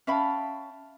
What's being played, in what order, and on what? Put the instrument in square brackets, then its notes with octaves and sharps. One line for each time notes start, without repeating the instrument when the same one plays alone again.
[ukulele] C#4 E5 B5 [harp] F5 G5 A5